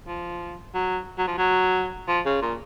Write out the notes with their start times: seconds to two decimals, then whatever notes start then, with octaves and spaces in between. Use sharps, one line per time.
0.08 F3
0.74 F#3
1.18 F#3
1.27 F3
1.38 F#3
2.08 F3
2.26 C#3
2.42 A#2